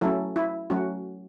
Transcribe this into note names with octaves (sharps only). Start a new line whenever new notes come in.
F#3 A3 C#4 E4 A4
E4
F#3 A3 C#4 F#4